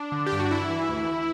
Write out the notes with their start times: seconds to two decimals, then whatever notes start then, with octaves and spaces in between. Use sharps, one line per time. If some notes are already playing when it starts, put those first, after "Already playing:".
Already playing: D4
0.12 D3
0.26 G4
0.32 G2
0.39 F#4
0.51 E3 E4
0.70 E3
0.89 D2